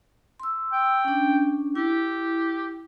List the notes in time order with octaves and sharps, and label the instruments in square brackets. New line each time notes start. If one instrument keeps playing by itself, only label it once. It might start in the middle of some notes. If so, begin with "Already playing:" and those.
[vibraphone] C6 E6
[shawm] G5
[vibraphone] C#4 D4
[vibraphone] E4 [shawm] G4